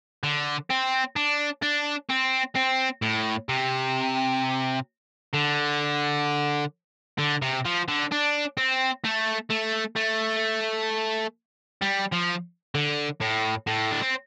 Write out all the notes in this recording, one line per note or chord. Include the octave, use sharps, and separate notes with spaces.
D3
C4
D4
D4
C4
C4
A2
C3
D3
D3
C3
F3
D3
D4
C4
A3
A3
A3
G3
F3
D3
A2
A2
D4
C4